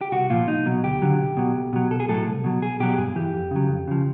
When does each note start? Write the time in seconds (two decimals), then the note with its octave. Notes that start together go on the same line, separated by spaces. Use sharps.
0.01 G4
0.12 C2 F#4
0.30 A#2 F3 F4
0.48 C2 D#4
0.66 B2 F#3
0.83 D2 G4
1.02 D3 F#3
1.19 B1
1.37 B2 F#3
1.55 B1
1.73 B2 F#3
1.91 B1 A4
2.00 G#4
2.09 A2 F#3 A4
2.27 C2
2.44 B2 F#3
2.62 B1 G#4
2.80 B2 F#3 G4
2.98 G2 G#4
3.15 E3 G4
3.34 F2
3.51 C#3 F#3
3.69 F2
3.88 C#3 F3